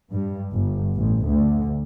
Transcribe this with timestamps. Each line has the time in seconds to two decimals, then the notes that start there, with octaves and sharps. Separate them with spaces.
0.12 G2
0.53 G1
0.97 A1
1.26 D2